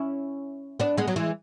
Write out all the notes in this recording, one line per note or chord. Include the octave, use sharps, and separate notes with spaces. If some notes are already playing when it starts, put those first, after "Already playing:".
Already playing: C#4 E4
B3 D4
G#3 B3
F#3
E3 G#3